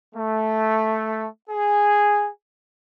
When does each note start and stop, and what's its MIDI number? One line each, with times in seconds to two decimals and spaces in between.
0.15 1.25 57
1.49 2.28 68